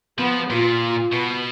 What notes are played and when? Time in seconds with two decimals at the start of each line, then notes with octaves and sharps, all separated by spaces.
0.19 F3 B3
0.50 A#2 F4
1.13 B2 B3